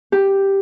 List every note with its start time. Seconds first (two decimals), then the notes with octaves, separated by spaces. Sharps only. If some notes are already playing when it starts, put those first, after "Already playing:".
0.12 G4